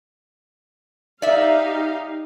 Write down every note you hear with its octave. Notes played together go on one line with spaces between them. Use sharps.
D#4 G4 D5 E5 F5